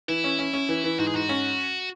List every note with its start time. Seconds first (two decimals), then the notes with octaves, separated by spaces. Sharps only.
0.08 E3 E4
0.24 C#4
0.39 C#4
0.53 C#4
0.69 E3
0.84 E3
0.99 G#2 F#4
1.07 G#4
1.14 G#2 F#4
1.29 C#4